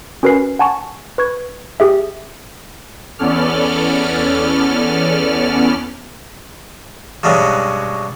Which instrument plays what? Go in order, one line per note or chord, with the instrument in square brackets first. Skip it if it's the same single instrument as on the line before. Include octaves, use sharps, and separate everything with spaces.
[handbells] C#4 F#4 A#4 B4 G#5 C7
F#5 G#5 A5 C#6
B4 C#6 G#6
G4 G#4 E5
[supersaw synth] E2 B3 C#4 A4 D5 F6
[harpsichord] G2 B2 F#3 G#3 C#4